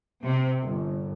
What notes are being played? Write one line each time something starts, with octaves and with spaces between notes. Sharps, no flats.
C3
G1